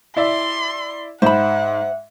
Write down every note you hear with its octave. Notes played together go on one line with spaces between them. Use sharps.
E4 D5 E5 C6
G#2 C5 E5 F#5 B5